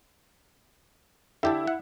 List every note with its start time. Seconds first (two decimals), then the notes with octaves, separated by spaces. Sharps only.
1.43 D3 E4 G4 A4
1.67 F#5